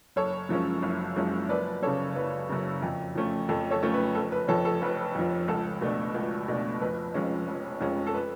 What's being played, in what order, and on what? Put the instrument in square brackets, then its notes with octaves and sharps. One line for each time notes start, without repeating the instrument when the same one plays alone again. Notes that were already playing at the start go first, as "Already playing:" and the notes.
[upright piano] F#1 A4 C#5
F#2 F3 G#3 C#4
F#1
F#2 F3 G#3 C#4
F#1 B4 D5
F#2 C#3 A4 C#5
F#1 B4
F#2 C#3
F2
F3 A3 C#4
F2 A4
A4 C#5
F3 A3 C#4
B4
F1 A4
B4
F2 F3 A4 C#5
A4
F1 B4
F2 F3
C#2 A4
B2 A3 D4
C#2
B2 A3 D4
F1 B4
F2 F3 G#3 C#4
F1
F2 F3 G#3 C#4
A4
B4